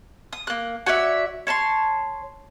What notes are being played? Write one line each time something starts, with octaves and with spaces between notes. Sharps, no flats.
D#6
A#3 F#6
F#4 C#5 D5 E5
C#5 A5 B5 C6